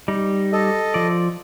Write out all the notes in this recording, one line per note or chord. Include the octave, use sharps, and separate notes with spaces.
G3 D#4
A4 D#5
F3 D5